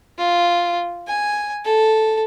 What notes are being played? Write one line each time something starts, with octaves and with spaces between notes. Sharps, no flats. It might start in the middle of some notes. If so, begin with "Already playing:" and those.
F4
G#5
A4